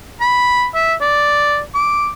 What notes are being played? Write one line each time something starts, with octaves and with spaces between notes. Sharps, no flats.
B5
E5
D5
D6